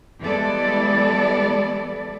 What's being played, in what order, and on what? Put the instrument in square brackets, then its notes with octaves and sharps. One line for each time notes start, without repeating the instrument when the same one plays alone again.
[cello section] E3 G3 G#3 B3 A4 D5